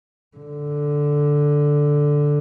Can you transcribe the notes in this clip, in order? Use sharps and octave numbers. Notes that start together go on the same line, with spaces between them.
D3